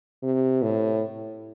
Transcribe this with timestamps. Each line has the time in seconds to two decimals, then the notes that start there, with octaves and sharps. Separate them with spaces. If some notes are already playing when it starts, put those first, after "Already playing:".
0.23 C3
0.63 A2